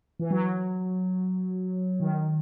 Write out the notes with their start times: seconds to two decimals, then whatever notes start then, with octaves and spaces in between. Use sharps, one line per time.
0.19 E3
0.31 F#3
2.00 D#3